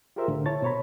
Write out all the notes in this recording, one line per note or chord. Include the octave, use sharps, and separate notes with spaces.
F4 G4 G#4 A#4 C5 E5
C2 A2 D3
E4 C#5 A5 A6
B2 C5 C#5 A#5 B5